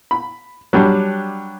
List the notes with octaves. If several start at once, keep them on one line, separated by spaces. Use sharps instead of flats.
B5
F#3 G3 D4